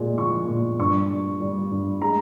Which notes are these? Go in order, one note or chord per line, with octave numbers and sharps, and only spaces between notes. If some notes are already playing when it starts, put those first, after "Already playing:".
Already playing: A#2 G#3
F3 C#6
A#2
G2 C#6
G3
G3
G2
G#3 A#5